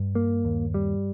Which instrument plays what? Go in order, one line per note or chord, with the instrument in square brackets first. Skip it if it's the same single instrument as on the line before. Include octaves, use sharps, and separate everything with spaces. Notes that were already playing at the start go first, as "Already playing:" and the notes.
Already playing: [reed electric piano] G2
[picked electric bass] A#3
D#2
G3